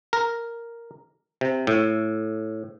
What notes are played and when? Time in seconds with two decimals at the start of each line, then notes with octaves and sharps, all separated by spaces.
0.13 A#4
1.41 C3
1.67 A2